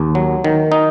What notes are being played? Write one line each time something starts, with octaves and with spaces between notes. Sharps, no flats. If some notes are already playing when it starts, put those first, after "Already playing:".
Already playing: D#2
F#3
D#3
D#4